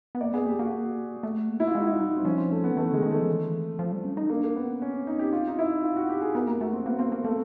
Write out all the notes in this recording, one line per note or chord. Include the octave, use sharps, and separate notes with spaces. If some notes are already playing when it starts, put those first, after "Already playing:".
B3
A#3 D5
B3 G#4
A#3 G4
A#3 F#4
A3
A#3
E4
F4
G#3 F#4
D#4
E4
G3 D#4
C4
F3 C#4
C4
A3
B3
E3 A3
D3 G#3
D#3
A3
F3
E3
F3
G3
C#4
D#4
A#3 D4
A#3
B3 C#4
C4 C#4
D#4
G4
F4
D#4
E4
F4
F#4
G4
G#4
B3 A#4
A#3 A#4
A3 F#4
A#3 C4
A#3 B3
A#3 C4
A#3
A3 A#3